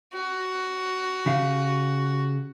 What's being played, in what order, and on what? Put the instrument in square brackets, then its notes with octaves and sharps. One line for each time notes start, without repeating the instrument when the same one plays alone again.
[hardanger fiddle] F#4
[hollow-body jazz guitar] C#3 G4 F5